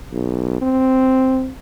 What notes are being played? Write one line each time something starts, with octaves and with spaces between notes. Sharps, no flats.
B1
C4